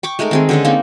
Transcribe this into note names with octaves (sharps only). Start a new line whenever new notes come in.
G5 C#6 D6
G#3 A3 D#4 A#4
D#3 C4 G#4
D3 G#3 C#4
A#3 C4 D#4